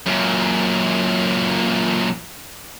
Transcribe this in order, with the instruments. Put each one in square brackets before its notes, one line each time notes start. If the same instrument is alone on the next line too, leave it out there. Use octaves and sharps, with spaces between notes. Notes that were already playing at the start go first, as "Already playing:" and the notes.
[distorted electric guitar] F#2 A#2